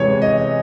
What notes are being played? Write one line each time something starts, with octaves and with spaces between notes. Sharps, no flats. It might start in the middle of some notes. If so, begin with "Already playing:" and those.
Already playing: C3 E3 G#3 C#5
D#5